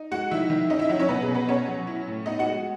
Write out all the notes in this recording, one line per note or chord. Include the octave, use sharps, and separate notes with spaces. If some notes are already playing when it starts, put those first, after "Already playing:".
Already playing: D#4
G#3 F#4 F#5
D#3 E4 E5
D#3
C#4 D#4 D#5
E4 E5
F#3 E4 E5
C#4 C#5
B2 B3 B4
G#4
B2
B3 B4
B3 C#4 C#5
F#3
E4
A2
B3 D#4 D#5
F#4 F#5
G#3